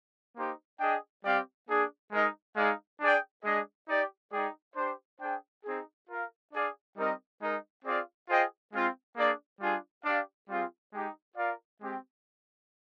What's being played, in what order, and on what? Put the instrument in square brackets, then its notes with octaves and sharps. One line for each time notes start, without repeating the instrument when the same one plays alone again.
[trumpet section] A#3 D#4 G4 C5
D4 G#4 D#5 G5
G3 C4 G4 D5 F5
A#3 D4 G#4
G#3 D#4 A#4 D#5
G#3 D#4 G#4 D5 F5
D4 G#4 D5 G5
G#3 D4 G#4 D#5
D#4 G4 D5
G#3 D#4 G#4 D5 G5
D4 G4 C5
D4 G#4 C5 G5
C4 D#4 G#4
F4 A#4 F5
D4 G#4 D5 F5
G3 C4 D#4 A#4 D#5
G#3 D#4 A#4
C4 F4 G#4 D5 F5
F4 G#4 C5 D#5 G5
G#3 C4 F4
A#3 D4 G#4 D5
G3 D4 F4 G#4
D4 G4 D5 F5
G3 C4 F4 G#4
G#3 D#4 G4
F4 A#4 D5 F5
G#3 C4 G4